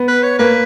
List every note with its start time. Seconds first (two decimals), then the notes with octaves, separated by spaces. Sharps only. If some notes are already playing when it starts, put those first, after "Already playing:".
Already playing: B3
0.08 B4
0.23 C#5
0.39 A#3 B4